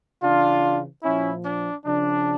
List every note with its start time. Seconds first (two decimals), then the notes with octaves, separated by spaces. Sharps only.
0.23 C#3 E3 D4 F4
1.04 A#2 F3 C#4 E4
1.44 D4
1.85 C#3 F3 D4